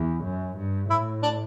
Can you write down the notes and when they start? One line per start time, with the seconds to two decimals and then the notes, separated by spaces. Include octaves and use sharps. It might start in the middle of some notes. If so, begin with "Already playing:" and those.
Already playing: E2
0.24 F#2
0.58 G2
0.90 A2 E4
1.23 D4